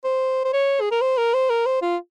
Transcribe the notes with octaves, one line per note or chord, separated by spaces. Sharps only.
C5
C5
C#5
G#4
A#4
C5
A#4
C5
A#4
C5
F4